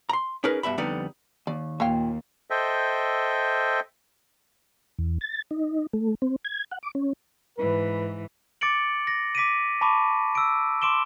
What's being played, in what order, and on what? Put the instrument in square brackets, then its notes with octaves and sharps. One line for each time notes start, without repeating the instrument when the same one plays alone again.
[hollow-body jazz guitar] A#5 C6
C#4 D#4 G#4 A#4 B4
G2 B2 E5 B5
F2 D3 G3 B3 D#4
[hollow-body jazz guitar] D#2 [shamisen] D5
[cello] D#2 [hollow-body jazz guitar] A#2 [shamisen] C#5 F5 G5
[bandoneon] A4 C5 D#5 E5 G5
[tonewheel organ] E2
A6
D#4
A3
C4
G#6
F#5
D6
C#4
[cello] G#2 E3 [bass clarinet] B4
[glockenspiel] D6 A6 C#7 D7 F#7
A#6
D6 B6 D7 D#7
A5 B5 C#6 D6
E6 D7
C6 D6 D7 E7 G7